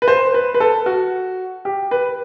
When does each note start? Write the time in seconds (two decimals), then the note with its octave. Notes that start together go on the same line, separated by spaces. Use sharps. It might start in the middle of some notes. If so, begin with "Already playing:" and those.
0.02 B4
0.08 C5
0.34 B4
0.54 B4
0.60 A4
0.86 F#4
1.65 G4
1.91 B4